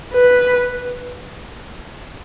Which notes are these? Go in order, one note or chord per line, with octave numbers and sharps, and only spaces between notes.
B4